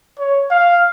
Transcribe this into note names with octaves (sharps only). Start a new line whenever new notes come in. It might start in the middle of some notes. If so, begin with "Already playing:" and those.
C#5
F5